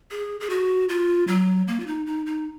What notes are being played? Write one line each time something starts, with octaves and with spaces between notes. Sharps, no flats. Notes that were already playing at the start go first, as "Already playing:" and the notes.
G#4
G#4
F#4
F4
F#3
A#3
F4
D#4
D#4
D#4